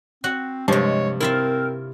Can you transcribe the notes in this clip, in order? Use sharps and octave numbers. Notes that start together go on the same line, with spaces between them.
C4 F#4 F#5
G2 C3 F3 G#3 C#5
C4 E4 F4 A#4 E5